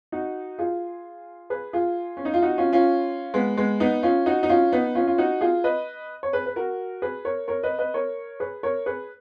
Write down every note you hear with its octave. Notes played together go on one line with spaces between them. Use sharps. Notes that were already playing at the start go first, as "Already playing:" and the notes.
D#4 F#4
F4 G#4
G#4 B4
F4 G#4
C#4
D#4
F4
D#4 F#4
C#4 F4
C#4 F4
G#3 B3
G#3 B3
B3 D#4
C#4 F4
D#4 F#4
D#4
C#4 F4
B3 D#4
C#4 F4
F4
D#4 F#4
F4 G#4
B4 D#5
C#5
G#4 B4
B4
F#4 A#4
G#4 B4
A#4 C#5
A#4 C#5
B4 D#5
B4 D#5
A#4 C#5
G#4 B4
A#4 C#5
G#4 B4